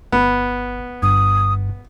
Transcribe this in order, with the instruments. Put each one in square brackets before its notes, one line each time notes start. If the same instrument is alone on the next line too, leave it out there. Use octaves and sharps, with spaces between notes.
[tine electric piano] G1 [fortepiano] B3
[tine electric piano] G1 G2 [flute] D#6